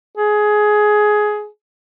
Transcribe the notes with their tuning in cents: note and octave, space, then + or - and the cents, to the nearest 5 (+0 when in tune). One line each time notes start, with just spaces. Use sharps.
G#4 +15